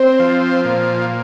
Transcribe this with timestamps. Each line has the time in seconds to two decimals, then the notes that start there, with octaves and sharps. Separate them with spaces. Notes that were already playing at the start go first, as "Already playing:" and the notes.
Already playing: C4 C5
0.20 F3
0.65 A#2